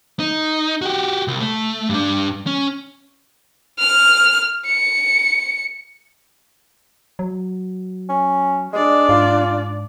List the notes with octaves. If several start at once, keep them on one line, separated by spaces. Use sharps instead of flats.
D#4
F#4 G4
C2
A3
G2 D4
C#4
F6
C#7
F#3
C#4
G#3 D4 D5
G#2 F4